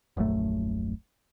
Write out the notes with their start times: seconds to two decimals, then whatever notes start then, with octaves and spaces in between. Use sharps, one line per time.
0.17 D#1 A#1 F#2 A3